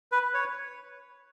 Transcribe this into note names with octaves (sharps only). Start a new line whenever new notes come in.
B4
C#5